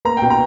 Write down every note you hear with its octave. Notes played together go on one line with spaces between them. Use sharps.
A#3 A#5
B2 G5
A#5